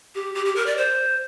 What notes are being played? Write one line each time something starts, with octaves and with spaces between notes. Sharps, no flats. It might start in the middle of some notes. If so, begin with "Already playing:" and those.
G4
G4
G4
A#4
D5
C5